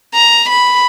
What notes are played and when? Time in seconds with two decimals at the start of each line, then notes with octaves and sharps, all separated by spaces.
0.14 A#5
0.49 B5